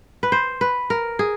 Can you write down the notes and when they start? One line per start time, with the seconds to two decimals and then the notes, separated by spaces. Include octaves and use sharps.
0.23 B4
0.32 C5
0.61 B4
0.90 A#4
1.19 G#4